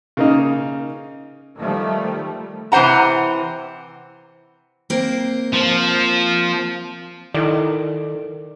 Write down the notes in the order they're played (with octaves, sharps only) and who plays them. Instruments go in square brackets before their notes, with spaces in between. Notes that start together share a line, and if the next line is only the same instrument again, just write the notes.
[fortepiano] C#3 A#3 D#4
[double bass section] D#3 F3 G3 A3
[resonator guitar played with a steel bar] C3 E3 C5 F#5 A#5
[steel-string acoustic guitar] A#3 C4 A#4
[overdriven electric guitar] F3
[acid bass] D#3 [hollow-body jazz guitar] E4 A4 D5